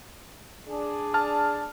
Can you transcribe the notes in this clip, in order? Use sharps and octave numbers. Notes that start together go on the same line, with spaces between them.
D4 G#4
A5 F6